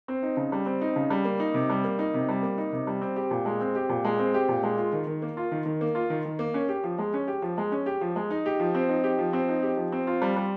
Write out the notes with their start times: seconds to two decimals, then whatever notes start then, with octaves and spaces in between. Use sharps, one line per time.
0.08 C4
0.23 D#4
0.37 C#3
0.52 G3
0.66 C4
0.81 D#4
0.96 C#3
1.10 G3
1.25 A#3
1.40 D#4
1.54 C3
1.70 G3
1.84 A#3
1.99 D#4
2.14 C3
2.29 G3
2.42 A#3
2.58 D#4
2.73 C3
2.87 G3
3.01 C4
3.16 G4
3.31 A#2
3.46 G#3
3.61 C4
3.75 G4
3.89 A#2
4.05 G#3
4.19 C4
4.34 G4
4.49 A#2
4.63 G#3
4.78 F4
4.93 D#3
5.07 D#3
5.22 A#3
5.37 F4
5.52 D#3
5.66 D#3
5.81 A#3
5.95 F4
6.10 D#3
6.25 D#3
6.39 A#3
6.54 C#4
6.69 G4
6.84 F3
6.98 G#3
7.14 C#4
7.28 G4
7.42 F3
7.58 G#3
7.72 C#4
7.86 G4
8.01 F3
8.16 G#3
8.31 D#4
8.46 G4
8.60 F3
8.75 C4
8.89 D#4
9.04 G4
9.19 F3
9.33 C4
9.49 D#4
9.63 G4
9.77 F3
9.92 C4
10.07 F4
10.22 G3
10.36 G3